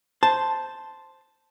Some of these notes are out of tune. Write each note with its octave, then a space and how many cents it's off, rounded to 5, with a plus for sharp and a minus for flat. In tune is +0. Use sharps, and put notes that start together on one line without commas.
C5 +0 A5 +0